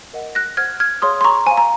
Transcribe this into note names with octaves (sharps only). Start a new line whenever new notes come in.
A#4 D#5 F#5
F#6 A#6
C5 F#5 F6 G#6
F6 G#6
G#4 C#5 F5 C6 D#6
C6
A#5 C#6
C5 F5 G#5
A#5